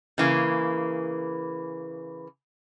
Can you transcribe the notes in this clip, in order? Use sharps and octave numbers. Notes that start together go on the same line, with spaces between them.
C#3 E3 A#3